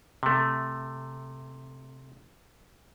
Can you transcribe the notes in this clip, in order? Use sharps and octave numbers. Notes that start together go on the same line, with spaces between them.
C3 A3